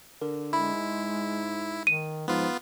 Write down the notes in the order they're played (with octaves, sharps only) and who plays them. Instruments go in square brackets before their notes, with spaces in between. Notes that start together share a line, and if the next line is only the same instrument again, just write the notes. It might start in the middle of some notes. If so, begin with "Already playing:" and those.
[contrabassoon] D3 [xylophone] A#4
[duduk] G#3 [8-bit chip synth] E4 [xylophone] B5
[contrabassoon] G#2
[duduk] D#3 [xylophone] D#7
[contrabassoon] G#2 [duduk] F3 [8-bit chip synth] B3 F4